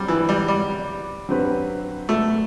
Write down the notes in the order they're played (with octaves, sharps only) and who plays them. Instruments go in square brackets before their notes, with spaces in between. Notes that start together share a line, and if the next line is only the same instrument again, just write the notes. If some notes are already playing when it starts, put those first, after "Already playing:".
Already playing: [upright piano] G2 F#3 C4 G4 [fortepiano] G3
[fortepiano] E3
G3
G3
[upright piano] G2 F#3 C4 G4 B4
[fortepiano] A3